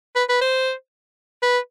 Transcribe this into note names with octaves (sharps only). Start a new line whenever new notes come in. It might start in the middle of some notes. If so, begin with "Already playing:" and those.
B4
B4
C5
B4